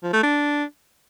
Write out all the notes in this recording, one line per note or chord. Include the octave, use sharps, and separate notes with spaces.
F3
A3
D4